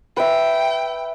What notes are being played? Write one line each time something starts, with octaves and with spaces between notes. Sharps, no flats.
B4 E5 G5